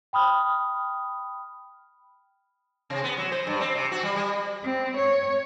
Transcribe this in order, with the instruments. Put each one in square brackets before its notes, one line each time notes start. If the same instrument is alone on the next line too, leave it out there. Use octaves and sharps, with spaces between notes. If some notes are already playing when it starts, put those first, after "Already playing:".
[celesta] G5 B5 D#6 F6
[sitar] C3
B3
F#3
C5
G2
C4
C3
F#4
G3
G3
[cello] C4
C#5